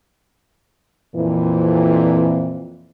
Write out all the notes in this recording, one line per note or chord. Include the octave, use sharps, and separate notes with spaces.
F2 A#2 E3